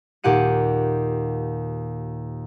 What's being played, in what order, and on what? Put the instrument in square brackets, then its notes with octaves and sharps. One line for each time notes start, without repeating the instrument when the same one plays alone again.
[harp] D#2 A#2 G4 F#5 D#7